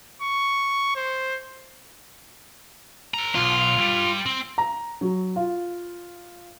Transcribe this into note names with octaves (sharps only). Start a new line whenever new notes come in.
C#6
C5
A4 A#5
B1 F4
G2 G3
C4
A#5
F#3
F4